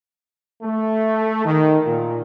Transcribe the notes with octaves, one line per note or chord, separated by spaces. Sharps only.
A3
D#3
A#2